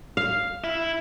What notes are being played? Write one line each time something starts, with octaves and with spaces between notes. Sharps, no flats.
F5
E4